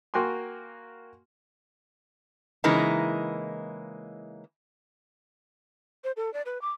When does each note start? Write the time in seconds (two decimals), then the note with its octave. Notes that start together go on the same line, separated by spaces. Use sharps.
0.14 A#3 F#4 G5 G#5 C6
2.64 C#3 E3 G#3 A#3 D#4 E4
6.04 C5
6.17 A4
6.34 D5
6.46 B4
6.62 D6